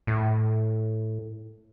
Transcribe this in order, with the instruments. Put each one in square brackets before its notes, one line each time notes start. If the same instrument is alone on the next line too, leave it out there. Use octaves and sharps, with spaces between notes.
[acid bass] A2